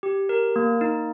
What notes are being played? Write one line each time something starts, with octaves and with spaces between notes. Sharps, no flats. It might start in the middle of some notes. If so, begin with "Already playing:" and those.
G4
A#4
A#3
D#4